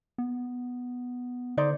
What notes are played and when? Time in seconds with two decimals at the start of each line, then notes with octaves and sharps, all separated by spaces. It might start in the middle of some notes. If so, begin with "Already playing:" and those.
0.18 B3
1.57 D3 D#4 C5 D5